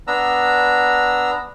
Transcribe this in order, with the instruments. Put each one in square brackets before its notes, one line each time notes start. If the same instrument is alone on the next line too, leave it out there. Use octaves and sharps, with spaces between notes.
[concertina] B3 D4 A#5 E6